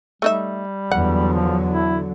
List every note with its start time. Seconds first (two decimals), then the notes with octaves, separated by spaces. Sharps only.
0.22 G3 A3 D#4 E5
0.92 E2 D3 F#3 F#5
1.33 F3
1.71 E4